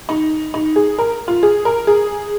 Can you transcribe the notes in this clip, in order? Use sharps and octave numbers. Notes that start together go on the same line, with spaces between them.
D#4
D#4
G#4
A#4
F4
G#4
A#4
G#4